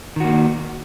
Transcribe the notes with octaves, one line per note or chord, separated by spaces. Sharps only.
D#3 A#3 F#4